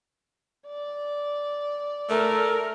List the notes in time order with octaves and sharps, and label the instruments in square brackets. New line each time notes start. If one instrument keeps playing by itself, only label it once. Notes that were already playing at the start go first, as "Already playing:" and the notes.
[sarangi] D5
[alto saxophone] A3 [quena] A#4